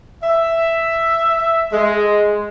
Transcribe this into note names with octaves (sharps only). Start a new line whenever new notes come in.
E5
G#3